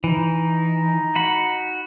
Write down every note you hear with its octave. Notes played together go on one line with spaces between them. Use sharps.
E3 D#4
F#4 F#5 B5